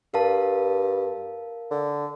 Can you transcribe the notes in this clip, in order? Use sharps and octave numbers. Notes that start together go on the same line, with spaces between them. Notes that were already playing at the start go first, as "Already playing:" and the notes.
G2 A#4 F5 A5
D3